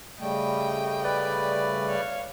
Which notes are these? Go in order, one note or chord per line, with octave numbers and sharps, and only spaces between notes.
C#3 G3 A3 D#5 G5
B4 D5
C#5 F5